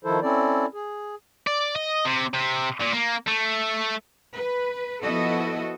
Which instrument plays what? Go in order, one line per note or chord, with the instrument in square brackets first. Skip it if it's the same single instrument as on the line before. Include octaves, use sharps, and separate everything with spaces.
[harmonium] D#3 F3 E4 A4 C5
C4 C#4 E4 A4 D5
G#4
[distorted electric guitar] D5
D#5
C3
C3
A#2
A#3
A3
[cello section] B4
F3 B3 E4 F#4 A4 D#5